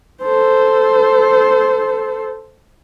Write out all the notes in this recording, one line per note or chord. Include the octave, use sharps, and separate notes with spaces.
A4 C5